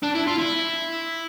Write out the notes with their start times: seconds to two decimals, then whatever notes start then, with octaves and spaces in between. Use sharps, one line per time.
0.03 D4
0.15 E4
0.27 F4
0.39 E4